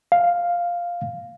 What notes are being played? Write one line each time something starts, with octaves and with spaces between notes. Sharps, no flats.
F5